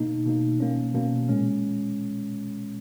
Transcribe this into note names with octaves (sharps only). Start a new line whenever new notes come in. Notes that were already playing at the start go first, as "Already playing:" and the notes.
Already playing: B2 A#3 D#4
B2 A#3 D#4
B2 A#3 C#4
B2 A#3 C#4
A#2 G#3 C#4